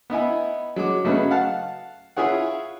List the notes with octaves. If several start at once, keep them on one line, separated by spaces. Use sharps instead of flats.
B3 D#4 E4 G#5
F#3 G#3 D6
C#3 F#3 A3 C#4 D#4 B4
F5 F#5 A5
E4 F4 G#4 C#5 F#5